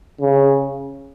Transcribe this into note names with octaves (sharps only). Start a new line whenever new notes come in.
C#3